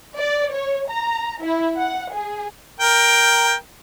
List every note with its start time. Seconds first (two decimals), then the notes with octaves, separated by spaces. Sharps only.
0.18 D5
0.54 C#5
0.89 A#5
1.42 E4
1.77 F#5
2.14 G#4
2.80 A#4 G5